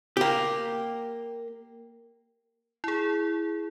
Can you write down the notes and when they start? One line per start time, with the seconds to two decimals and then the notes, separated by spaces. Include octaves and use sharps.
0.17 A#3 G4
2.84 E4 G#4